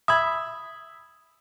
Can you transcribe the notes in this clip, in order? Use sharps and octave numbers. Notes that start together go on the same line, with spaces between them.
E5 B5 D#6 G#6